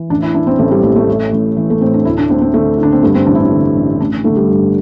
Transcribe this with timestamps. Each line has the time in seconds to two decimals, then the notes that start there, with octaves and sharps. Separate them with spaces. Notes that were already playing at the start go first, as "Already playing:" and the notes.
Already playing: E3
0.10 A1 D4
0.22 E4
0.35 E3 D4
0.47 C4
0.59 A1 A3
0.71 G3
0.83 A1 G3
0.96 A3
1.07 A2
1.33 A1
1.57 E3
1.70 A3
1.81 A2 C4
1.94 D4
2.05 D2 E4
2.18 D4
2.30 D2 C4
2.41 C4
2.54 D3 A3
2.78 D3 D4
2.92 C4
3.03 G2 A3
3.15 C4
3.27 A1 D4
3.35 E4
3.39 D4
3.51 D3
3.76 A1
4.00 A1 D4
4.24 D3 A3
4.37 G3
4.49 G2